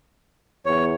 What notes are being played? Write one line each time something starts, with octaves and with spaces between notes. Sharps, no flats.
E2 C#5